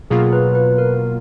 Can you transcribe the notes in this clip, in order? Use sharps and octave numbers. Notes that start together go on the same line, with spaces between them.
B2 F#3 A#3 F4 G#4
B4
B4
A#4